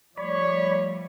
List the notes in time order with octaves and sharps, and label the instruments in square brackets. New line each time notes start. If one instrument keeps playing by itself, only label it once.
[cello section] F3 G3 A3 [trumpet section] C#5 [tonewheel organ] D5 B5